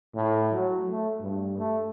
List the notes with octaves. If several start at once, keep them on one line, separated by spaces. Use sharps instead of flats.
A2
F#3
A3
G2
A3